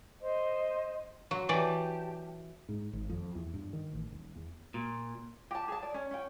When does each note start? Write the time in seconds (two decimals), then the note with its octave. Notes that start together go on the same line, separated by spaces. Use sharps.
0.21 C5 D#5
1.31 F#3 C6
1.49 E3 F#3 G4 D5 A5
2.69 G#2
2.93 G#1
3.09 F2
3.35 E2
3.54 G2
3.73 D#3
3.93 A1
4.12 D#1
4.35 E2
4.74 A#2
5.51 G4 A5
5.68 G#4 A5
5.83 D5
5.94 C#4
6.11 C#4 G5